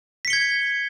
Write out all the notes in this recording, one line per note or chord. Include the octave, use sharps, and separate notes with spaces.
G#6 B6 C#7 G7